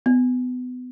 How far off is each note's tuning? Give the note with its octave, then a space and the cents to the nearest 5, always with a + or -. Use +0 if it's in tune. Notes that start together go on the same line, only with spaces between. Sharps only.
B3 +25